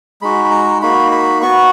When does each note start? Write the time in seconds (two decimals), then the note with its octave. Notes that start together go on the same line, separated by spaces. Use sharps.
0.21 G#3 D#4 F#4 B5
0.45 B5
0.51 A#5
0.82 A#3 D#4 F#4 B5
1.12 B5
1.42 B3 F#4 C#6